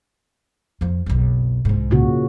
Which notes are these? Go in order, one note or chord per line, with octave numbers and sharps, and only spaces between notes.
F2 F3
F#1 B1
C2 G#2
A#2 C#3 F#4